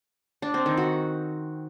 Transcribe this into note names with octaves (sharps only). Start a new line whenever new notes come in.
D4
C4
D#3
F#4